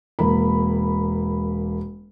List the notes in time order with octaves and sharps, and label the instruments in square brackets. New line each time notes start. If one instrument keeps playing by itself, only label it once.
[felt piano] E1 A#3 B5